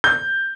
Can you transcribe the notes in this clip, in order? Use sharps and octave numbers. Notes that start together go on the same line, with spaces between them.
G6